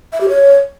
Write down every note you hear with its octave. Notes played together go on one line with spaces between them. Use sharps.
E5
G4
C#5